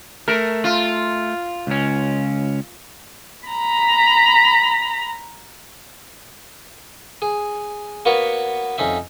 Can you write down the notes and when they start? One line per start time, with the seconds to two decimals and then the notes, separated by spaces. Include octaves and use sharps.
0.28 A3 A#4
0.64 F4
1.67 C#2 C#4
3.48 A#5 B5
7.22 G#4
8.05 A#3 B3 F#4 B4 C#5
8.78 F2 C#4 D#4 E5